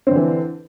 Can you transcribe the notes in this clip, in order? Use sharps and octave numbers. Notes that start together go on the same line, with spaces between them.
D3 E3 C4